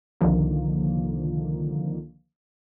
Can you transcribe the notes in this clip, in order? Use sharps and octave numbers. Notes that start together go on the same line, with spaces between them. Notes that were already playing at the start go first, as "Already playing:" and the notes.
C2 D3 D#3 F3 A#3